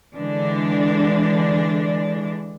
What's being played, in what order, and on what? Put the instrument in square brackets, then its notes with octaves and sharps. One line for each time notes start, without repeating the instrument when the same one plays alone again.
[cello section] D3 E3 G#3 D4